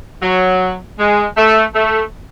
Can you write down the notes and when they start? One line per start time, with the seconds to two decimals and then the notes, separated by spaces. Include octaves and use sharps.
0.22 F#3
0.99 G#3
1.37 A3
1.75 A3